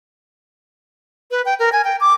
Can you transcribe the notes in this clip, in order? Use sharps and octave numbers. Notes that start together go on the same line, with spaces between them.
B4
G5
A#4
G#5
G5
D6